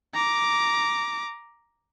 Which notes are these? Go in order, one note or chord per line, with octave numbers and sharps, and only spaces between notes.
A#5 D6